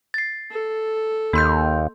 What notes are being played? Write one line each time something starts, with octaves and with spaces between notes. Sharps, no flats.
A6 C7
A4
D#2 A#3 C6 G6